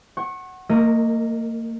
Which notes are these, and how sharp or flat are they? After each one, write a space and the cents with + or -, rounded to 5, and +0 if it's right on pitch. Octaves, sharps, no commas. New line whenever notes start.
F#5 +10 C#6 -35
A#3 -35 A#4 +0 D#5 +0